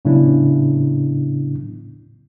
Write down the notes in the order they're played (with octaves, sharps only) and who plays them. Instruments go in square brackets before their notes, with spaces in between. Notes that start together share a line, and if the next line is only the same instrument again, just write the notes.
[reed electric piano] A2 C#3 F#3 B3 D4 E4